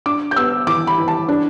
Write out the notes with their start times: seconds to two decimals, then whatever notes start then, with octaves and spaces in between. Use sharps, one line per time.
0.06 D4 D6
0.31 G6
0.36 B3 E6
0.67 E3 D6
0.87 B5
0.98 E3
1.08 A5
1.29 D4